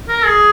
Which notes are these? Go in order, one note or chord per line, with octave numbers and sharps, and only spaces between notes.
A#4
G#4